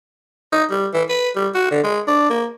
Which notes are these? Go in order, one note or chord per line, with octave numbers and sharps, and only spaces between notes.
D#4
G3
E3
B4
G3
F#4
D3
G#3
D4
A#3